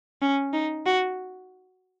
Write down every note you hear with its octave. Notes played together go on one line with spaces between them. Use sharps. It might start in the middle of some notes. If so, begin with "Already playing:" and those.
C#4
D#4
F#4